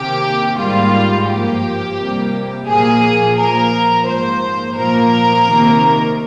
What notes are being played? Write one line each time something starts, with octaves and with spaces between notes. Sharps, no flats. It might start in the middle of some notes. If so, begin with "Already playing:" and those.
Already playing: C3 D#3 A#3 G4
G#2 G3 A#3 F4
G2 F3 A#3 G4
C3 G3 A#3
A#2 F3 A#3 G#4
A#2 F3 A#3 A#4
G#2 F3 A#3 C5
A#2 F3 A#3 A#4
C3 D#3 A#3